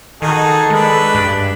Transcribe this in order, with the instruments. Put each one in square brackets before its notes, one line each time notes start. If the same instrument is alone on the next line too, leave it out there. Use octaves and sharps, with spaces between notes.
[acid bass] D#3 [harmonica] D#4 F#4 G#4 [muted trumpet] A4
[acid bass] G#3 [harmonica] D4 B4
[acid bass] G2